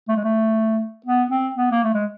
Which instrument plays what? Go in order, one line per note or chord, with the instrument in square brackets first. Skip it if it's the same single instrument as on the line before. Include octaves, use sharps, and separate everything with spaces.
[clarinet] A3
G#3
A3
B3
C4
B3
A#3
A3
G#3